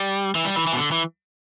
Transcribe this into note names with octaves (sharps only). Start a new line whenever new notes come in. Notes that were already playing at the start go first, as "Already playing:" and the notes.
Already playing: G3
E3
G3
E3
E3
B2
D3
E3